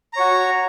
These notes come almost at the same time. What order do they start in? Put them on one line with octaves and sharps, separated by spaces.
A#5 C#5 F#4